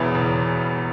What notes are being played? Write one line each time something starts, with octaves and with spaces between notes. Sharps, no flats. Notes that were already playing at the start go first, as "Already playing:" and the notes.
Already playing: E1 E2 E3
E1